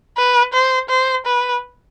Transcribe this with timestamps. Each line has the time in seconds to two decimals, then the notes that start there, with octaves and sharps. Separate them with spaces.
0.17 B4
0.53 C5
0.89 C5
1.26 B4